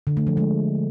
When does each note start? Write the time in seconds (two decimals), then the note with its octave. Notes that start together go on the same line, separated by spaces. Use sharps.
0.07 D3
0.17 A3
0.27 F3
0.37 G#3